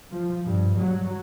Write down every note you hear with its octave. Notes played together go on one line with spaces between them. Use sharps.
F3
G2
F#3